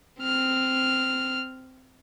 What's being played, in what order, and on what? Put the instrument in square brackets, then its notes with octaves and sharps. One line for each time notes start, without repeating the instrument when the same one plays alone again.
[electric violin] C4 F6